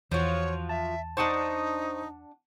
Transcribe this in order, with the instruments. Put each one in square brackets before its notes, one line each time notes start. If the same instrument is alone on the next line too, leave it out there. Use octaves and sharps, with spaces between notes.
[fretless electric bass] E2 [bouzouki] F3 F4 F#4 [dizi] C#5
[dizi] E5 [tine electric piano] A5
[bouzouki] D4 F#5 A5 [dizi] D#4 [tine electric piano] C5 C#6 D#6